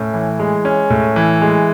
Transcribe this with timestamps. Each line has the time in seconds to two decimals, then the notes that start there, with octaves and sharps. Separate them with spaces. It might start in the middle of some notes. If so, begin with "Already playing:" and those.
Already playing: A2 C#4
0.14 E3
0.40 G#3
0.65 C#4
0.90 A2
1.16 E3
1.42 G#3